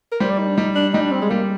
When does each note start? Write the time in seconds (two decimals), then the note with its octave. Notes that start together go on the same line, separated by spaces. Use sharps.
0.12 A#4
0.20 G3 C5
0.30 D5
0.39 D#4
0.47 D4
0.57 G3 D#4
0.75 D4
0.94 G3 D#4
1.02 D4
1.11 C4
1.22 G#3
1.30 G3 A#3